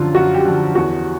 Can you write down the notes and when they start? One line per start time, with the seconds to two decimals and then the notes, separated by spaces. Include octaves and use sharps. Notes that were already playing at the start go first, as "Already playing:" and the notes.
Already playing: F#2 D3 F3 F4
0.15 F#2 F#4
0.34 G4
0.45 D3 F3
0.75 E2 F#4